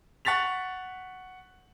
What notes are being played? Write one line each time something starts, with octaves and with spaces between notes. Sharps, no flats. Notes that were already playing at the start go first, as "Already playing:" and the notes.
F#5 C#6 A6 B6 F7